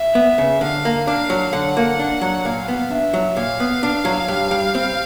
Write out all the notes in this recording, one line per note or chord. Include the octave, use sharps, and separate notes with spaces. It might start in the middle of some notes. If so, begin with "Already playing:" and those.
Already playing: E5
B3
C#3
D3 F5
A#3
D4 F5
F#3
D3 F#5
A#3
D4
F#3
A#2 F5
B3
D4 E5
F#3
A#2 F5
B3
D4
F#3
G2
G3
C4